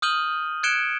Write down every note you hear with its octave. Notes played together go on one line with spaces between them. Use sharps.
D#6 F6 G6 D#7 F#7 G7
F#6 G#6 C#7 D7 E7 G7